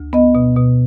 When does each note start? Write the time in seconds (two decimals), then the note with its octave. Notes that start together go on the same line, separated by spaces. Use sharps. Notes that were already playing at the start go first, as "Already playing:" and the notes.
Already playing: D2
0.13 B3 D#5
0.35 B2
0.56 B2